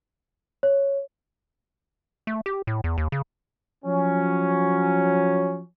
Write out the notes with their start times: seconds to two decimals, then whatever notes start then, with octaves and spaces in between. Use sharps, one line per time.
0.63 C#5
2.27 A3
2.46 G4
2.67 A2
2.84 E2
2.98 D#2
3.12 C#3
3.85 F3 F#3 C#4